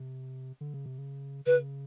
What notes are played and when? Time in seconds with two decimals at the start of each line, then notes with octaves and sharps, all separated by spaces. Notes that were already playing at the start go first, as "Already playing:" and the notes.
Already playing: C3
0.61 D3
0.74 C#3
0.86 C3
0.98 C#3
1.46 C#3 B4